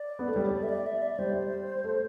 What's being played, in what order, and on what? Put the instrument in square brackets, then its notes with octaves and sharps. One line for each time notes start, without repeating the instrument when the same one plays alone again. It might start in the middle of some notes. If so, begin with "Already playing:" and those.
Already playing: [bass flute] D5
[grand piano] B3
A3
G3
[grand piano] A3 [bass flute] C5
[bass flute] D5
E5
D5
E5
D5
[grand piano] G3 [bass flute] C5
[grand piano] A3